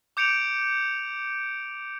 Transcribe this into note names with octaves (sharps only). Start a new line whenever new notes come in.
D6 G6 C#7 D7 F7